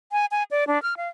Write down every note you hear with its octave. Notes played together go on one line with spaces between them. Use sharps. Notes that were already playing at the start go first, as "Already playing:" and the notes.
G#5
G#5
D5
D4
F6
F5